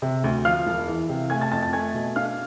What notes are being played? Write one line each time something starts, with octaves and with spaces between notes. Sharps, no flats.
C3
D2
F3 F5 F6
E1
E3
C3
A3 G#5 G#6
A5 A6
F2 A5 A6
A5 A6
A3 G#5 G#6
B2
D4 F5 F6